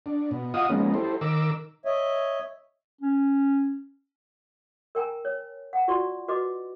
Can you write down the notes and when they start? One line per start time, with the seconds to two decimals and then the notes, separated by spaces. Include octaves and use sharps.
0.06 D4
0.31 B2
0.54 F4 D#5 F5 F#5 D#6
0.69 F3 G#3 A#3 B3 C#4 D#4
0.94 E4 G4 A4 C5
1.21 D#3 A#4 D6 E6
1.85 C#5 D#5 E5
3.01 C#4
4.95 A#4 G5 G#5 A#5
5.25 C#5
5.73 F#5 A#5
5.88 F4 F#4 D5 C6 C#6
6.28 F#4 B4 D#5 D6